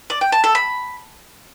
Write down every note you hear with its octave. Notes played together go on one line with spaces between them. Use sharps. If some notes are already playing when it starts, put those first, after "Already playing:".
D5
G5
A5
A4
B5